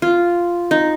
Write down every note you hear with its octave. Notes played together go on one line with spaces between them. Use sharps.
F4
D#4